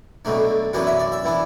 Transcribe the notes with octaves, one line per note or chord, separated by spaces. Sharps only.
B1 B2 A3 D4
F#2 E3 B3 D4 F#5
E5
D5
E5
E3 B3 D4